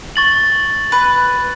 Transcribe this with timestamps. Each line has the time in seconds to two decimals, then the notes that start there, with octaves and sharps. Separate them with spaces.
0.16 C#6 A6 F#7
0.92 B4